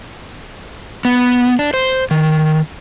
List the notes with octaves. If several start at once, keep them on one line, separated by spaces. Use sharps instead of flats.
B3
D4
C5
D#3